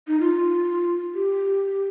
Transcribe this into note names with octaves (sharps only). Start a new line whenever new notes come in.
D#4
F4
G4